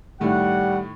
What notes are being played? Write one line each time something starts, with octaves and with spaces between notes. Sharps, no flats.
A2 D#3 G3 A3 F#5